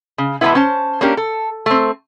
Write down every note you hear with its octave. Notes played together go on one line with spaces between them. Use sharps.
C#3
A2 E3 F#3 G#3 B3 E4
C#4 C5 A5
A#3 C#4 D4 G4 A#4
A4
A3 C4